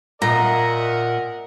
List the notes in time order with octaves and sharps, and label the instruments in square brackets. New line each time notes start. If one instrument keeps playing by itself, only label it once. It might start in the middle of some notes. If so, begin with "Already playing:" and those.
[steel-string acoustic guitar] A#2 [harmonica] A#4 D#5 [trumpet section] E5 F#5 [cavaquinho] A#5